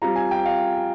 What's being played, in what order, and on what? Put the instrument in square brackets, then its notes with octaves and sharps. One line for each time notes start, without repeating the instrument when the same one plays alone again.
[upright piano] G3 C4 F4 A#5
G#5
G5
F5